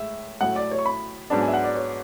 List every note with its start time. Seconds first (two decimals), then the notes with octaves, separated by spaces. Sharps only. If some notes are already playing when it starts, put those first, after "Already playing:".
Already playing: A2 G#3 E5
0.41 A2 F#3 A3 E4 A4 F#5
0.56 D5
0.71 C#5
0.79 C#6
0.86 B5
1.30 G#2 F#3 B3 D4 A5
1.41 G#5
1.48 E5
1.54 F#5
1.64 D5
1.76 C#5